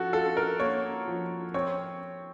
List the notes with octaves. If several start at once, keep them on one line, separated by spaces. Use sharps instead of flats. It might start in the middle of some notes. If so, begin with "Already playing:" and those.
Already playing: F3 F#4 A4
F4 A4
A#4
A#3 C#5
F3
C4 C#5